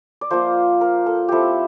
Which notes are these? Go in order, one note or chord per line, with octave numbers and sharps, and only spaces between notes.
D5
F3 A#3 F4 C5
A#4
A4
F3 C4 E4 G4 A4